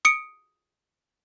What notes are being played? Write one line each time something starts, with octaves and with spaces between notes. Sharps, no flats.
D#6 C#7 D7